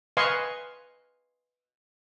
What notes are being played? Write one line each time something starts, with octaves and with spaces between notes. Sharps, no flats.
B4 D#5 F5 G#5 C6 C#6